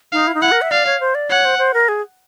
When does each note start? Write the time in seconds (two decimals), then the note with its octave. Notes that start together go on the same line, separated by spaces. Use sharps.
0.12 D#4 F5
0.27 E4
0.34 D#4
0.41 E4 F#5
0.52 A#4
0.62 E5
0.71 D5 F5
0.86 C#5
1.00 C5
1.15 D5
1.30 C#5 F#5
1.45 C5
1.59 C5
1.74 A#4
1.89 G#4